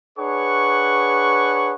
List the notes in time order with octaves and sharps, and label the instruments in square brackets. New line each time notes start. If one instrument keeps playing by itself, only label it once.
[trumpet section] D4 G#4 B4 C#5 F#5 C#6